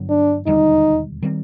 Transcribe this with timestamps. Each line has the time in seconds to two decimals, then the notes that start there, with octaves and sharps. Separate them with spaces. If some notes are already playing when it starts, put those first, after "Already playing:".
Already playing: G1 G2 D3 F#3
0.09 D4
0.46 E1 D#2 D3 G3 D#4
1.22 D#3 G3 C4